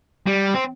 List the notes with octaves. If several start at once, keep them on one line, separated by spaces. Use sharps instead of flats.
G3
C4